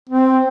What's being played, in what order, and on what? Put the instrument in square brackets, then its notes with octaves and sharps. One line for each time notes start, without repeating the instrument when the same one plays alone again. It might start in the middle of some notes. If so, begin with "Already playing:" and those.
[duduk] C4